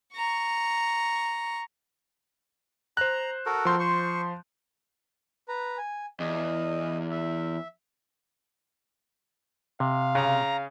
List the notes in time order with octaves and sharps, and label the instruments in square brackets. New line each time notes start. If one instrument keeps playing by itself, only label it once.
[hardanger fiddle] A#5 C#6
[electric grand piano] C5 F#6 [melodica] A#5
[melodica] F#4 A4 A#4
[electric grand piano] F3 C6 G6
[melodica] C5 C#6
[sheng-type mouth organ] B4 A#5
G#5
[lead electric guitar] E2 [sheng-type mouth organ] D#5
[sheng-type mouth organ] E5
[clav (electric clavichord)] C3 [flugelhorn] F5
[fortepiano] C#3 [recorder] A#5